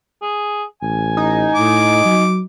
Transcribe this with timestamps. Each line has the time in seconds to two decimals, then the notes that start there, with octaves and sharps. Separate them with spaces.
0.22 G#4
0.82 A1 G#5
1.17 D#4
1.55 A2 D6
2.05 F#3